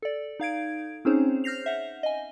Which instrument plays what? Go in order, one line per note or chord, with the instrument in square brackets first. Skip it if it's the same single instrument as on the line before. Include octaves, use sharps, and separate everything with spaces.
[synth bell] A4 D5
D#4 F5 G#6 D7
C4 C#4 D#4 G#4 C5 C#5
F6 G6 A#6 C7 F7
E5 F#5
D#5 G#5